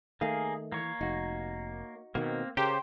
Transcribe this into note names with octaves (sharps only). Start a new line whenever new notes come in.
D#3 A3 A#3 G#4 F5
E3 A#3 C#5
F1 D#4 F#4
B2 D#3 A#3 C4
C#3 G4 A#4 C5